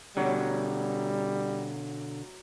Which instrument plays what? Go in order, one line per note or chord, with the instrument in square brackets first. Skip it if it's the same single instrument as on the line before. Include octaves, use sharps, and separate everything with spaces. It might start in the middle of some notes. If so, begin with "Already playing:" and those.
[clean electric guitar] B2 D3 [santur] F#3 [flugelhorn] G3